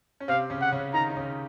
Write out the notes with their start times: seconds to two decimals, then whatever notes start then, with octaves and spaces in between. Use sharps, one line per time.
0.20 C#4
0.28 C3 C4 F5
0.50 C#3 C#4
0.61 F#5
0.72 C#3 C#4
0.94 D#3 D#4 A#5
1.10 D#4
1.16 C#3 C#4